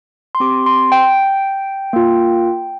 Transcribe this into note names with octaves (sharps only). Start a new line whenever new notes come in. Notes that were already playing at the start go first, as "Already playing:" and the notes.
C6
C4 G4 D6
C6
G5
A#3 F4